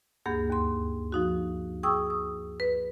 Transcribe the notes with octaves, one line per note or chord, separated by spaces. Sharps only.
D2 G2 A#3 G#4 G6
D#2 C6
F3 D#4 F#4
G#4 G5 C#6 D#6 E6
D#6
B4